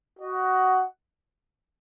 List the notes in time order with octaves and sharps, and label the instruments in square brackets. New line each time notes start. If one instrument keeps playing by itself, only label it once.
[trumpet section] F#4 D#5 F#5